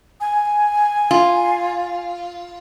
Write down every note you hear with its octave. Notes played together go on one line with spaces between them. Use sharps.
G#5
F4